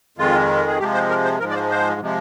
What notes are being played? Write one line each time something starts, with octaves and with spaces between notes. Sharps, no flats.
F2 D#3 G#3 F4
G#4
C3 F3 G#3 G4
C5
A#4
C5
G#2 F3 G#3 A#4
D5
C5
C5
C3 F3 G#3